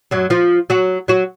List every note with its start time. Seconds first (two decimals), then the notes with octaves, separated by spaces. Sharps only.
0.11 F#2 F#3
0.30 F3 F4
0.70 F#3 F#4
1.08 F#3 F#4